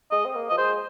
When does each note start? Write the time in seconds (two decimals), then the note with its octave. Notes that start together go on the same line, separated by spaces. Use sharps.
0.11 G#3 D#5
0.25 C4
0.35 A#3
0.50 F3 D#5
0.58 G#3 C5